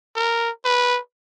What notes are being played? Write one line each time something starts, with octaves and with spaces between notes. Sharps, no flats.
A#4
B4